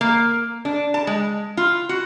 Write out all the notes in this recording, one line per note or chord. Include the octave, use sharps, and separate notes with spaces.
A#3
D4
A5
G#3
F4
F#4